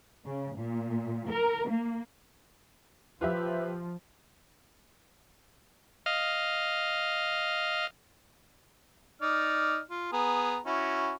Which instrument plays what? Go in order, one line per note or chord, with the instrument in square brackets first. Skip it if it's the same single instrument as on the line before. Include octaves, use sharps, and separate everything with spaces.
[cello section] C#3
A#2
A#4
A#3
[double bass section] F3 [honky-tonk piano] F4 G4 E5 [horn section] B4
[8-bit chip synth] D#5 F5 F6
[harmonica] D#4 D5 F6
F4
B3 G#4 A#5
C#4 E4 F#4